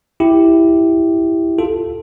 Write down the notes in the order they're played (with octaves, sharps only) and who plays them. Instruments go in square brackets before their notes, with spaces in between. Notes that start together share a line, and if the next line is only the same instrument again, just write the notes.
[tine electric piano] E4 G4
F4 A4